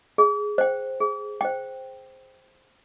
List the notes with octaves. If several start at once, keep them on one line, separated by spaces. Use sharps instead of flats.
G#4
C5 G5
G#4
C5 G5